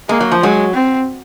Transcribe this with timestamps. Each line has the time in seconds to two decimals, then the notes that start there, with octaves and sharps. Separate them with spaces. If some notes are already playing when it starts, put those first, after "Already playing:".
0.09 G#3 A#3
0.21 F#3
0.32 F3
0.41 F#3 G#3
0.74 C4